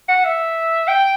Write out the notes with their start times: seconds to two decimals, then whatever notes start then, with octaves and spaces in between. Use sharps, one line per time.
0.09 F#5
0.24 E5
0.88 G5